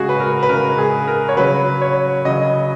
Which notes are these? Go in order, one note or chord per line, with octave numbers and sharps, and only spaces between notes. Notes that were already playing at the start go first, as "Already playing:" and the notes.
Already playing: C#3 G#3 F#4 G#4
B4
A#4
B4
C#3 G#3 A#4
G#4
A#4
C#5
C#3 F#3 B4
C#5
C#3 F#3 D#5